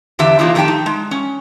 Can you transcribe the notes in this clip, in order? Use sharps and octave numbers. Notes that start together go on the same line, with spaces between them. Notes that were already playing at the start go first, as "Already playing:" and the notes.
E2 D3 D4 G4 E5
C3 E3 A#3 D#4 F4 G#4
F2 D#3 A3 G4 G5 A5
D#4
G#3
C#4